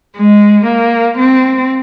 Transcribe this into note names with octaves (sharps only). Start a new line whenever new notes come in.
G#3
A#3
C4